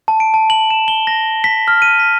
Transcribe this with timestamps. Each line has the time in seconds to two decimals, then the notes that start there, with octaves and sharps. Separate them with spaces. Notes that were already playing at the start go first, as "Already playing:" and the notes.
0.08 A5
0.20 D7
0.34 A5
0.50 F#7
0.70 E7
0.88 G7
1.07 A#6
1.44 B6
1.68 F6
1.82 D#7
1.99 B6